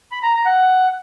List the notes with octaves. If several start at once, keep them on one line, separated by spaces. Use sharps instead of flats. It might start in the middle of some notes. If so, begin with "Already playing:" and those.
B5
A#5
A#5
F#5